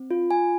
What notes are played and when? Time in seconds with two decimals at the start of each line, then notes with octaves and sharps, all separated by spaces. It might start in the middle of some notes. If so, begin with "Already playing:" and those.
Already playing: C4
0.11 F4
0.31 G#5